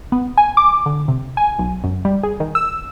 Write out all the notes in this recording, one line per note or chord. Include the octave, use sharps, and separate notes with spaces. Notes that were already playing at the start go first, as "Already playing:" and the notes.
B3
G#5
D6
D3
C3
G#5
B1
F#2
G3
G#4
D#3
E6